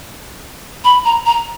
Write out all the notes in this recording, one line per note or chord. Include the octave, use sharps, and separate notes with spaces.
B5
A#5
A#5